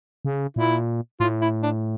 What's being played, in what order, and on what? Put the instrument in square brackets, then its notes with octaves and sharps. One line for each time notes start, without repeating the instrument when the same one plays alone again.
[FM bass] C#3
[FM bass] A#2 [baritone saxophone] E4
[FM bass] A2 [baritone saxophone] F4
[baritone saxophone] E4
D4